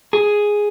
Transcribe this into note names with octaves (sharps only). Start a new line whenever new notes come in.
G#4